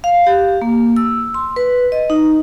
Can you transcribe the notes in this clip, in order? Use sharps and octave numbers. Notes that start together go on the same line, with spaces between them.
F5
G4
A#3
E6
C6
B4
D#5
D#4